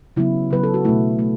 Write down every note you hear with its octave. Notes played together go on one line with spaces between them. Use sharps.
C#3 F#3 B3 E4
C#3 F#3 B3 B4
A4
F#4
B2 A3 E4
A3